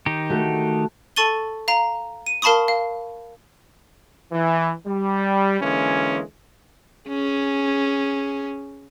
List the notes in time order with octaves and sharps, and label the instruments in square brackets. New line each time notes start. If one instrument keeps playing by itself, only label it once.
[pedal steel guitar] D#3 D#4 G4
[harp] A3 F#4
[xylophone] A4 A5 C#6 A6 D#7 G7
F5 A#5
D#7
A#4 F5 A5 B5 C#6 D#6
F5
[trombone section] E3
G3
D3 E3 G#3 A#3 C#4
[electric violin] C#4 G#4